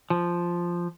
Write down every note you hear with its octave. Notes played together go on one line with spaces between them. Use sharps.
F3